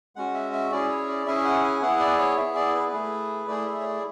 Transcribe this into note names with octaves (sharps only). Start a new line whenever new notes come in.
G#3 C#4 F#4 F#5
E5
E5
C#4 E4 G#4 D5
C#5
D5
C#4 E4 G#4 E5
F#5
G#5
B3 E4 G#4 F#5
D5
C#5
B3 E4 G#4 E5
D5
B4
A3 E4 G#4
A3 E4 G#4 D5
E5
C#5
D5